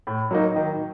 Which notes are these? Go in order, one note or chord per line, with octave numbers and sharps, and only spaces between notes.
A2
F#3 A#3 D#4
D#3